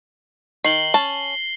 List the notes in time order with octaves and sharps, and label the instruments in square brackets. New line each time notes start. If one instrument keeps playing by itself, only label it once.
[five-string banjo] D#3 [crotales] C7 F#7 G7
[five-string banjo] C#4 A5